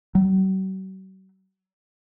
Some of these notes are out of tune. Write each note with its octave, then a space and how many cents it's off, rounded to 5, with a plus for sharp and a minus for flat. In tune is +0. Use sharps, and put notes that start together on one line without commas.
F#3 +45